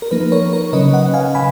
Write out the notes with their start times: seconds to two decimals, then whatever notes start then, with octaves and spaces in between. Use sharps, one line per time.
0.02 A#4
0.11 F3 A#3 D#4 B4
0.32 A#4 C#5
0.53 A#4 C#5
0.73 C#3 F#3 C#4 B4 D#5
0.93 D#5 F#5
1.14 F5 G#5
1.35 C#3 G#5 B5